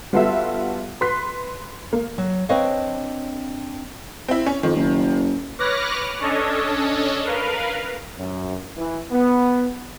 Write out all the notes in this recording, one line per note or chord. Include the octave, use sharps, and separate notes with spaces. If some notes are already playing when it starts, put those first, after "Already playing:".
G3 B3 F4 F#4 A4 E5
B4 C6 F#6 B6
A#3
F#3
C4 D4 B4 C#5 D#5 F5
C4 E4
C#4
F2 D#3
F#1
B4 C#5 D6 F6 F#6 A#6
C#4 D4 A4 C#5 D#5
A#4 B4 F5
F#2
E3
B3